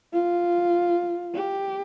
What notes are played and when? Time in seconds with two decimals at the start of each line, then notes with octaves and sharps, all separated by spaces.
0.13 F4
1.34 G4